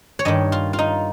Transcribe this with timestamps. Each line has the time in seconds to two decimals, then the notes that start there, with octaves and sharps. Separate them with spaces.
0.19 C#5
0.25 G2 D#3 D#5
0.52 F4
0.73 F4
0.79 D#4